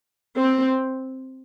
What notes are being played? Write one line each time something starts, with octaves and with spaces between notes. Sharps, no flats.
C4